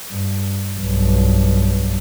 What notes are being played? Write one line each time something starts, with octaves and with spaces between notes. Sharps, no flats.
G2
B1 G2